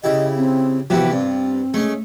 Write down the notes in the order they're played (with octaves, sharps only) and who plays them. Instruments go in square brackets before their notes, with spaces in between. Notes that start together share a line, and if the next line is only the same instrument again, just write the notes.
[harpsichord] C#3 E4 G4 [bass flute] D#5
[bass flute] C4
[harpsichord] C3 E3 E4 [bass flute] F3 [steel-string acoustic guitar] B3 F#4 G4
[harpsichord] G2 [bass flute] C4 [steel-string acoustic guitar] F4
[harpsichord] G#3 C#4 [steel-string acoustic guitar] A3